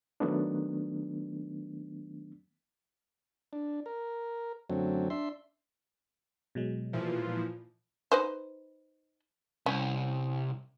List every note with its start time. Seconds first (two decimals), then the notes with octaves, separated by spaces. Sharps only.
0.20 D#3 F#3 A3 B3 D4
3.53 D4
3.86 A#4
4.70 F#2 D3 F#3 A3 C4
5.10 D4 E5 C6
6.55 B2 F#3 G#3
6.93 A#2 E3 F3
8.12 D#4 B4 C5
9.66 C2 C#4